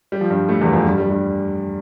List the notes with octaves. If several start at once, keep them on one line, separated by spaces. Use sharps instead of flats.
G3
F3
G2 G3
A2 A3
E2 E3
F2 F3
G2 G3
G2 G3
G2 G3